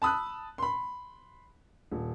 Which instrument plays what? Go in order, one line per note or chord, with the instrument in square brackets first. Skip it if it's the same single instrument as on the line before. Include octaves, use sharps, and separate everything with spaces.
[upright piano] A5 B5 D#6 E6 F#6
B5 C6
D#1